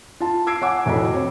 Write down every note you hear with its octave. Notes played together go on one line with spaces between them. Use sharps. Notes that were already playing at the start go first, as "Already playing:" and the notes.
F4 A5
E6 G#6 C7 D7
C#5 F#5 G#5 D6
F1 A2 F#4 A4 D#5 B5
C4 C#5